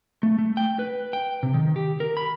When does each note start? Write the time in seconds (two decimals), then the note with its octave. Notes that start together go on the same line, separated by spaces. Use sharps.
0.23 A3
0.39 A3
0.57 G5
0.79 B4
1.13 G5
1.43 C3
1.54 D#3
1.76 G4
2.00 A#4
2.17 B5